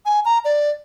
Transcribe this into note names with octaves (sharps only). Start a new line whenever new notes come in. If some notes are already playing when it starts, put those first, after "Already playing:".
G#5
A#5
D5